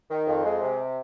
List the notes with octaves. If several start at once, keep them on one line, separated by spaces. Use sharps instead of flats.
D#3
F2
G#3
C3